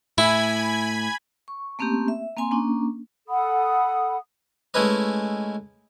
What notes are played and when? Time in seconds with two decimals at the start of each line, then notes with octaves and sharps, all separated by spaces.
0.18 A2 E4 G#5 B5 G#6
1.48 C#6
1.79 A3 A#3 C4 C#4 G4
2.08 E5
2.37 A#3 C4 G#5 C6
2.51 A#3 C#4 D4
3.28 A4 F#5 B5 D#6
4.74 G#3 A3 C#4 E4 B4 D#5